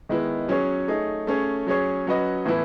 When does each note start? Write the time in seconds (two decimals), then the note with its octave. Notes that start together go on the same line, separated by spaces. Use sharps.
0.09 D#3 G#3 B3 E4
0.48 F#3 C#4 G#4 C#5
0.88 A3 D#4 G#4 C#5
1.27 A3 C#4 G#4 C#5
1.66 F#3 C#4 G#4 C#5
2.07 F#3 C#4 F#4 B4 D#5
2.46 A2 E3 B3 E4